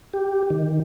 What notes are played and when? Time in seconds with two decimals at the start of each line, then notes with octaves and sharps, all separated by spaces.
0.13 G4
0.50 D#3